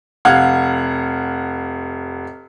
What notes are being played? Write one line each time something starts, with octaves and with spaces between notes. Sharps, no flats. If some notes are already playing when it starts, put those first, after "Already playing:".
F1 F5 F#5 F6 G#6